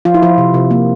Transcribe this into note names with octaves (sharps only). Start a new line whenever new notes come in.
F3 F4
E4
F3 F4
C3
C3
A#3